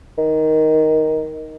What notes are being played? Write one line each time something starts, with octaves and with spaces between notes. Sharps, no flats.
D#3